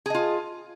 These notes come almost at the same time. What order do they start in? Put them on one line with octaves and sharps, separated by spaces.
G#4 D#5 F4